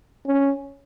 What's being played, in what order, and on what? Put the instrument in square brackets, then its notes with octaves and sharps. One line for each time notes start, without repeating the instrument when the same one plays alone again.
[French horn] C#4